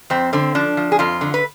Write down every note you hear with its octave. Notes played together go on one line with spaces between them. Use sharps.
F2 C4
D3 C4
F3 D4
F3
G#4
F2 F4
D3
B4